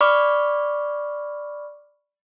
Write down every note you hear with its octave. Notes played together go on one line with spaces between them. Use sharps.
D5 B5 C#6 D6 F6